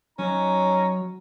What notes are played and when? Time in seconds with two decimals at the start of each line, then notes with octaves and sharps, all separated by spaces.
0.19 F#3 C#4 D#4 A#5